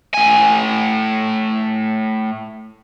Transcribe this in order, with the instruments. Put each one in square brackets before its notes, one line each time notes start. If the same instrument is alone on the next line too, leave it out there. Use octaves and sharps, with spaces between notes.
[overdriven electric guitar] A2 G#5